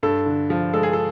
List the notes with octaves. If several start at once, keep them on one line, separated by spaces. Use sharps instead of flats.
G2 A4
D3
F3
G#3 A4
G#4
A4